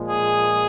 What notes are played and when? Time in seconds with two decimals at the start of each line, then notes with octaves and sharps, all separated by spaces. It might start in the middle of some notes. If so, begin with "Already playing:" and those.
Already playing: A#2 F3 G#3
0.09 G#4